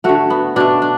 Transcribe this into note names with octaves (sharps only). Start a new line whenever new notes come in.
D3 A3 F#4
B3
B2 A3 D4
D4